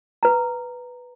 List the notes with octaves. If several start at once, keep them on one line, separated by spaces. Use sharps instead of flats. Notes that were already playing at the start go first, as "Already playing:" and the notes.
B4 A#5